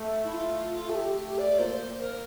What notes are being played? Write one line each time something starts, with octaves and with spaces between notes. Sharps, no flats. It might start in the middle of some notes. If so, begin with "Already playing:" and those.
Already playing: A3
E4
F4
F4
A4
G4
G4
D5
A#3 C5
A#4